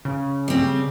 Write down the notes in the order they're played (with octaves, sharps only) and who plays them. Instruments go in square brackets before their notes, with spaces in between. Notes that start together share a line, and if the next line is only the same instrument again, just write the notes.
[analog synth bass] C#3
[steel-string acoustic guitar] G3 C4